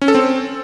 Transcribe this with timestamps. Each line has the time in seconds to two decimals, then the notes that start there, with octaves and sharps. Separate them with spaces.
0.02 C#4
0.08 A4
0.15 C4